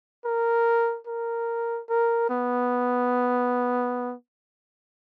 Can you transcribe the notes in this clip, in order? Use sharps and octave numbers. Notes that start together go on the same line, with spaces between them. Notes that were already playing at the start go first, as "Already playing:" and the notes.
A#4
A#4
A#4
B3